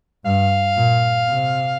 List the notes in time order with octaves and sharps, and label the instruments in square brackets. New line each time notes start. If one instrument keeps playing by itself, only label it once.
[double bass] G2 [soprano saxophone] F5
[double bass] A#2
C3